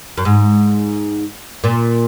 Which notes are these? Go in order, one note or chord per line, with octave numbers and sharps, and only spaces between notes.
F#2
G#2
A#2